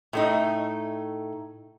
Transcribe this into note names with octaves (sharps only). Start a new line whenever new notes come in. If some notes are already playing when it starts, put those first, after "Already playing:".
A2 A3 D#4